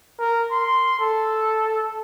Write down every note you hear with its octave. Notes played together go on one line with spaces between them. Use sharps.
A#4
C6
A4